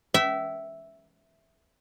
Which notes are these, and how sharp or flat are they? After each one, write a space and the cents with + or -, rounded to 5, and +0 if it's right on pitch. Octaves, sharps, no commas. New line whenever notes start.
E5 +0 G5 -35